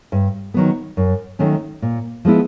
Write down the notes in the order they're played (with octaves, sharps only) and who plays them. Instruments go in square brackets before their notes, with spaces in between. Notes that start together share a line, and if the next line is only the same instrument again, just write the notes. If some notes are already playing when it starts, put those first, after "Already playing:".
[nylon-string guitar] G2
D#3 F#3 B3
F#2
D#3 F#3 A3 C#4
A#2
F3 G#3 B3 E4